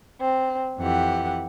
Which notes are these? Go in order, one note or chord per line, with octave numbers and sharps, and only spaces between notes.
C4
F2 E3 G4 F#5